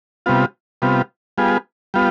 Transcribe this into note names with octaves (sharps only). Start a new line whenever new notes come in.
C3 G3 B3 F4
C3 G3 B3 F4
G3 B3 F4 G#4
G3 B3 F4